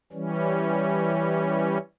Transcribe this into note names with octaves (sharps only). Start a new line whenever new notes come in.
E3 G3 C#4